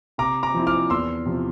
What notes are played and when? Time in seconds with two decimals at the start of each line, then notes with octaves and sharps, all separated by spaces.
0.18 C3 A#5 D6
0.43 A#5 D6
0.54 F3 C4 E4
0.67 D6 F6
0.90 E2 C6 E6
1.26 C3 F3